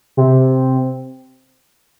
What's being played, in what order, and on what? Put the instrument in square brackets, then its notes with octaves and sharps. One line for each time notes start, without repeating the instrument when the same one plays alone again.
[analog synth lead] C3